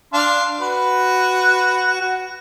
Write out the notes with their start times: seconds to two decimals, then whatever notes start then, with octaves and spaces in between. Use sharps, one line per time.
0.13 D4 F5 C6
0.59 F#4 B4
2.01 F#4